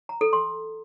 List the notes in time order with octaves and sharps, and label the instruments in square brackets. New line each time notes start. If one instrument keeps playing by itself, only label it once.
[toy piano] A#5
A4
C6